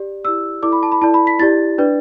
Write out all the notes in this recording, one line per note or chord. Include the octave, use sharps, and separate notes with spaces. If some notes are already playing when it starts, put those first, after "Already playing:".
Already playing: G4 D5
E4 G4 D5 E6
E4 A4 D5 D6
B5
A5
B5
E4 A4 D5 A5
B5
B6
E4 G4 D5 A6
D4 B4 D5